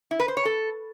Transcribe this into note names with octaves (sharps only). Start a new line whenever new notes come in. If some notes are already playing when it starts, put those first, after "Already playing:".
E4
B4
C5
C#5
A4